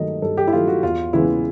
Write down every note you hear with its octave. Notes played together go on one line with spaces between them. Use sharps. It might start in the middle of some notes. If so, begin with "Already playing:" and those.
Already playing: G2 D#3 F#3 A3 D#5
G2 A4
G4
E4
D#3 F#3 A3 F4
F#4
E2 F4
C#3 E3 G#3 B3 E4